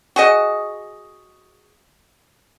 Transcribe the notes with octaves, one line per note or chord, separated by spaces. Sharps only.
F#4 G#4 D#5